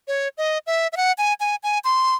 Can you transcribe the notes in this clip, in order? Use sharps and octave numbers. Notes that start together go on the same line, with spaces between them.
C#5
D#5
E5
E5
F#5
G#5
G#5
G#5
C6